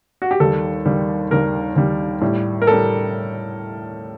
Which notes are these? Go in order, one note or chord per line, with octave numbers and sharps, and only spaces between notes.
F#4
G4
D#2 D#3 G3 A4
D#2 D#3 G3
D#2 D#3 G3 A#4
D#2 D#3 G3
A2 G3
A#4
A2 G3 A4